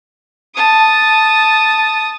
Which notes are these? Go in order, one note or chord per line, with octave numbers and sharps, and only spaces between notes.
A5 D#6